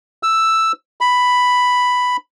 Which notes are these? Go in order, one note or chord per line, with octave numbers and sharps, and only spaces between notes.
E6
B5